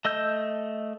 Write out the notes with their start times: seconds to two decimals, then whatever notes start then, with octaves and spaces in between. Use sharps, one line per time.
0.05 A3 D#5 E6 G6